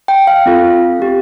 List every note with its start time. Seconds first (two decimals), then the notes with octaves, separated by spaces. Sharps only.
0.08 G5
0.27 F5
0.46 C4 F4 A4
1.00 C4 G4